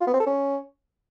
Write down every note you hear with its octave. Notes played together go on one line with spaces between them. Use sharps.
F4
B3
C4
A4
C#4